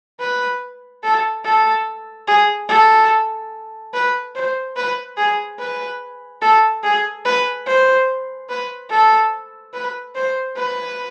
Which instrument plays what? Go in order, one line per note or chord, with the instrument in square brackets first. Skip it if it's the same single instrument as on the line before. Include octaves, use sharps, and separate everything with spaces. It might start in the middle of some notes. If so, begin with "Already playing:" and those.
[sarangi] B4
A4
A4
G#4
A4
B4
C5
B4
G#4
B4
A4
G#4
B4
C5
B4
A4
B4
C5
B4